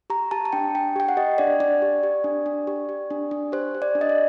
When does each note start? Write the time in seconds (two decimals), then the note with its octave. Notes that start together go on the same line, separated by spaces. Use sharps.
0.10 G4 A#5
0.31 G4 A5
0.45 A5
0.53 D4 G5
0.75 D4 G5
0.96 G4 G5
1.09 F#5
1.17 G4 D#5
1.38 D4 D5
1.60 D4 D5
1.82 G4
2.03 G4
2.24 D4
2.46 D4
2.67 G4
2.89 G4
3.11 D4
3.31 D4
3.52 G4 C5
3.75 G4
3.82 D5
3.95 D4
4.01 D#5
4.09 D5